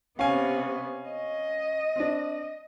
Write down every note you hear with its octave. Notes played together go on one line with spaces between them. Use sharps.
C3 B3 C#4 F5 G#5
D#5
C4 D4